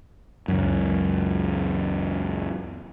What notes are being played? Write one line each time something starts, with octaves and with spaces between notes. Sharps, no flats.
C#2 F#2